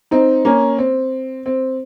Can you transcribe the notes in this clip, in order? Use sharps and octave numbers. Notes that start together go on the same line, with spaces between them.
C4 D#4
A#3 C#4
C4
C4